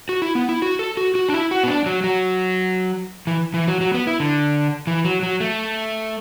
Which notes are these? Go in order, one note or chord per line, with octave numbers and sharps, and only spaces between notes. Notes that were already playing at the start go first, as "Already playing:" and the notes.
F#4
E4
B3
E4
F#4
A4
F#4
F#4
D4
E4
F#4
B3
D4
F#3
F#3
E3
E3
F#3
F#3
B3
E4
D3
E3
F#3
F#3
A3